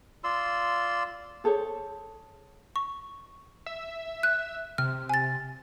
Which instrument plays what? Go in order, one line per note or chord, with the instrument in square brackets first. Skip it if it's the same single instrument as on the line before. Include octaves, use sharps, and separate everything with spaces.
[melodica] F4 D5 C6 E6
[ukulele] G#4 A4 C5 C#5
[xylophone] C#6
[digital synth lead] E5
[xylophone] F#6
[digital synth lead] C3 [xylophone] F6
[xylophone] G#5 A6